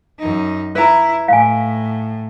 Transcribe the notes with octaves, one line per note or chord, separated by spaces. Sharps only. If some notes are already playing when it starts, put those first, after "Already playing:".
F#2 D#4
E4 B4 A#5
A2 F5 G#5